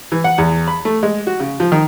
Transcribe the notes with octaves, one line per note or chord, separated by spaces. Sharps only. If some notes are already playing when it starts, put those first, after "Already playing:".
E3
F#5
E2
B5
A3
G#3
F#4
C#3
F3
D#3